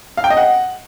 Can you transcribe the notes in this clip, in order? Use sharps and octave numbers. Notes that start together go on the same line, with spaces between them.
F5
G5
D#5
F#5